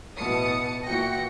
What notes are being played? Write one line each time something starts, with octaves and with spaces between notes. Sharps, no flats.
A1 B2 E3 A5 D#6 C#7
A#2 E3 F#4 G5 A#6 C#7